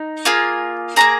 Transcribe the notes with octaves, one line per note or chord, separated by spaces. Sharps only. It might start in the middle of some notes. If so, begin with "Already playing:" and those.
Already playing: D#4
A#3 F4 G#4 G#5
A#3 C#4 G#4 A#5